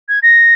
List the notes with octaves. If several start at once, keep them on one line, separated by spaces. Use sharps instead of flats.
G#6
A#6